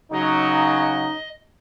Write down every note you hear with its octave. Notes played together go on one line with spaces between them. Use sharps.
C#3 F#3 D#4 D#5